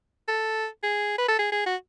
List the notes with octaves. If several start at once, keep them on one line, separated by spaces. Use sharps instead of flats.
A4
G#4
B4
A4
G#4
G#4
F#4